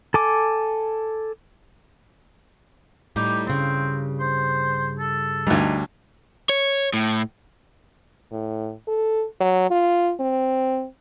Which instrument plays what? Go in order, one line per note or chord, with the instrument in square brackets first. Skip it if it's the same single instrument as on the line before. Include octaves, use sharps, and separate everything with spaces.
[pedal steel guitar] A4 G#5 D6
[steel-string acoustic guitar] A2 G3 D#4 [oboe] G4
[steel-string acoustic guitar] G2 C#3 [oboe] C4
[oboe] C5
A4
[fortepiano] D2 G2 [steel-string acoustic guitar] D#4
[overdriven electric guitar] C#5
A2
[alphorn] A2
A4
F#3
F4
C4